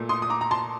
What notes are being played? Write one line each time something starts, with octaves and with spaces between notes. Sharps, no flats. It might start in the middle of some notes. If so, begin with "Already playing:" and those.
Already playing: A#2 A3
C6 D#6
D#6
A#5 D6
A#5
A5 C6